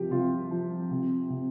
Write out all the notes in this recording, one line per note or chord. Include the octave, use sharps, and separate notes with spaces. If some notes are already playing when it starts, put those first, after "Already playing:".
Already playing: C3 F3 G4
C3 F4
F3
C3
C3